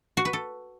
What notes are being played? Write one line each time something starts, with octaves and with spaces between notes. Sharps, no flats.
F#4
B4
A4